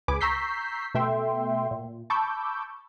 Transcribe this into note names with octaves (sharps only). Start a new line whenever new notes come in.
C#2 G#4 B4 G#5 B5 D6
A#5 C#6 E6 G6 B6 C7
B2 A3 E5 G5 C6
A#2
A5 B5 C#6 D6 E6 G6